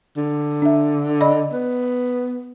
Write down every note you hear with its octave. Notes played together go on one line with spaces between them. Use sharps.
D3
D4 E5
D5 D#5 B5
B3